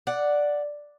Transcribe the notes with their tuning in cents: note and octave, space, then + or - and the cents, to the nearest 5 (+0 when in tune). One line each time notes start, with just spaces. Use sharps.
D5 +0 F#5 +0